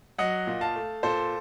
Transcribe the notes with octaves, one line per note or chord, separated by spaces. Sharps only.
F#3 D#5 F#5
A#2
F5 A5
A3
A#2 A4 C5